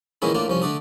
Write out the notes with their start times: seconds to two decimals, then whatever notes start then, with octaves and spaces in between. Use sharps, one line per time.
0.22 A#2 D#3 E3 G#3 C#4 E4
0.35 A2 A#3 D4 F4
0.48 C2 F3 C#4
0.62 D3 A3 D4 D#6